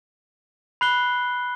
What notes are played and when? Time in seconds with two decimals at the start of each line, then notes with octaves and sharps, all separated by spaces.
0.81 B5 F#6 C7 G7